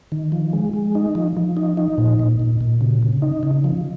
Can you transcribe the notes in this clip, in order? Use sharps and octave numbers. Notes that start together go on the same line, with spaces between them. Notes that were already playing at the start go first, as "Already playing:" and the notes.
D#3
F3
G#3
G#3
D#4
F3
F3
D#4
D#4
A#2
A#2
A#2
A#2
C#3
C#3
D#4
C#3
F3